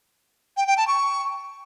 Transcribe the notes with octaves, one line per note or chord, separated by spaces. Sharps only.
G5
G5
A5
C#6